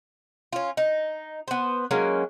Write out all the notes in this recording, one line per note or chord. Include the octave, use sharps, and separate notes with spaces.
C#4 F4
D#4
B3 C5
F#3 G#3 A#3 C#4